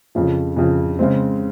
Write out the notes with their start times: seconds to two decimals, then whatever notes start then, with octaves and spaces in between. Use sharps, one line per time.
0.15 F2 C#3 F3
0.57 F2 C#3 F3
0.99 C#3 G#3 C4